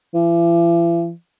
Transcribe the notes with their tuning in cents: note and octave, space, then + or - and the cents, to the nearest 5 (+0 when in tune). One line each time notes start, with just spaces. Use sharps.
E3 +45